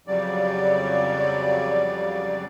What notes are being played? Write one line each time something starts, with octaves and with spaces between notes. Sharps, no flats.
F2 C#3 F#3 G3 D5